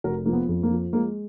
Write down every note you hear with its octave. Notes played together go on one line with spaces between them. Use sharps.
F1 F#4 A#4
F3 A#3
B3
F2
A#3
F3
G#3 A#3